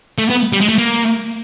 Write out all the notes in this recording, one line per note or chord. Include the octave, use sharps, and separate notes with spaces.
A3
B3
G3
G#3
A3
A#3